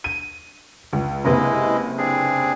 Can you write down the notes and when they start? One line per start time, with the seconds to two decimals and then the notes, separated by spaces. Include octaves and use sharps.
0.04 D#7
0.93 C#2
1.25 F#1 C3 G#3 E4 B4 D#5
1.98 C4 D4 G#4